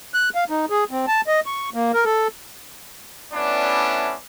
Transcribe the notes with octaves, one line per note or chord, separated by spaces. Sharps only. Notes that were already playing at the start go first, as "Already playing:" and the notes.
F#6
F5
D#4
G#4
C4
A5
D#5
C#6
A#3
A#4
A4
A3 B3 C#4 D4 E4 D5